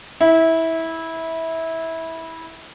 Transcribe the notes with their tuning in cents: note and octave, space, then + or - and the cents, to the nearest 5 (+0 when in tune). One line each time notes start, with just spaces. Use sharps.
E4 -20